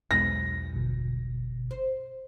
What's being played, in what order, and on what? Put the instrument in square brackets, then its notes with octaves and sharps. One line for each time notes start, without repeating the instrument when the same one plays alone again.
[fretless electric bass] B1 E2 G#3 [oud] B4 [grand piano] A#6
[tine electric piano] G1 B2
[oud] C5